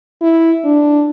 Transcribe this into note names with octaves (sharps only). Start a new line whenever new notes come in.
E4
D4